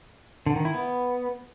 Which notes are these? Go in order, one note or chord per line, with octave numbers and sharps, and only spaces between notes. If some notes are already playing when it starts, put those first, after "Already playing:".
D3
D#3
E4
B3